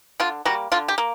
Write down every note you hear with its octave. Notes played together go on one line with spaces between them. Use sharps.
D3 F4
G3 A#3 F#4
D3 F4
G4
A#3